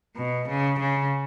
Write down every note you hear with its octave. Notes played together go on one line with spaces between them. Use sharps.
B2
C#3
C#3